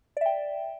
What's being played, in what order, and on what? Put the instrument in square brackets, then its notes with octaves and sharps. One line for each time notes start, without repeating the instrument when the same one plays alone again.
[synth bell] D5
E5
G5